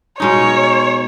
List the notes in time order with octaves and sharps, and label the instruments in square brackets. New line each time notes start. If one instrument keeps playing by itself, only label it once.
[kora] B2 G#3 D#4 [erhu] C#5